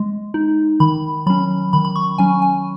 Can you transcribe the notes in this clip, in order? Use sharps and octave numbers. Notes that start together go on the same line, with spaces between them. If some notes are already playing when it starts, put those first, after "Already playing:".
Already playing: G#3
D#4
D#3 B5
F#3 C#4 B5
D#3 B5
B5
C#6
F#3 C#4 G#5
G#5